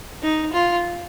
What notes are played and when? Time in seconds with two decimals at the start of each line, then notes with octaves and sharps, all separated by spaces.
0.23 D#4
0.53 F4